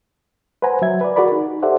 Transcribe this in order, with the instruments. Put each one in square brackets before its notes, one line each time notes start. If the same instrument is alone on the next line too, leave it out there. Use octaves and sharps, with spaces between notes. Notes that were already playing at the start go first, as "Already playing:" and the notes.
[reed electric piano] B4 C5 F#5 G#5 A#5
F#3 E5 G#6
B4 D5
F#4 G#4 A#4 D5 B5
D#4
G4 A4 C5 D5 E5 F#5